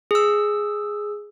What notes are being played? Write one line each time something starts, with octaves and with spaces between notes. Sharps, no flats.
G#4 E6